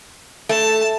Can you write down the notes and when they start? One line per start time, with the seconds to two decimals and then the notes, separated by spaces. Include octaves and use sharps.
0.49 A3 A5